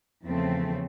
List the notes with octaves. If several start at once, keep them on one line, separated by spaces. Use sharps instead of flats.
E2 C#3 F3 A3 C4